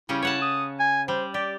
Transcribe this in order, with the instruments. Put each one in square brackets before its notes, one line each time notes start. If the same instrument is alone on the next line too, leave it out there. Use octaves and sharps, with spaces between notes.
[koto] C#3 G3 C#4 [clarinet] E4
[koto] C#5 F#5 A5
[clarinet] D#6
G#5
[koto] G3 [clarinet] C5
[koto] G4 [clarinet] D5